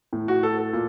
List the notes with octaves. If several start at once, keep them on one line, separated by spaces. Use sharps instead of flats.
A2
F#4
A4
A4
A#2